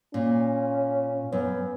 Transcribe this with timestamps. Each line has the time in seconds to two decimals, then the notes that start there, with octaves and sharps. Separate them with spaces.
0.14 A#2 C#4
1.32 F#2 B3